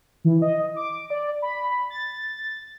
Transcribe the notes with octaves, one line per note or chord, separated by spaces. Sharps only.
E3
D#5
D6
D5
B5
A6